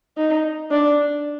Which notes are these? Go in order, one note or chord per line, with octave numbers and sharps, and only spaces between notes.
D#4
D4